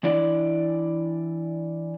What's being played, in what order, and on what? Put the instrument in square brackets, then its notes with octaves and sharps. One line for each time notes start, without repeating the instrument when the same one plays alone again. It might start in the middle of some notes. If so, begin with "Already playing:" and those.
[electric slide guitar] E3 D4 E4 D5